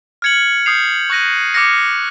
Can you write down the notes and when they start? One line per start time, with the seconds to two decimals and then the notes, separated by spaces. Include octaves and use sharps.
0.22 F6 G#6 C#7 F#7
0.66 D#6 G6 C7 F7
1.10 C#6 F#6 A#6 D#7
1.54 D6 F6 A#6 C#7